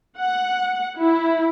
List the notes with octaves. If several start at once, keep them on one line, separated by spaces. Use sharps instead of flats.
F#5
E4